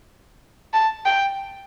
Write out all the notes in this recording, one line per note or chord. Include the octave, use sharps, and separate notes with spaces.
A5
G5